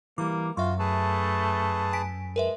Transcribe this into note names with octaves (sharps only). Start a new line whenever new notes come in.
E3 G3 A#3 D6
F#2 F4 F#4 E5 C#6
A3 G#4 B4 A5
G#5 B6 D7
G#3 A#4 B4 E5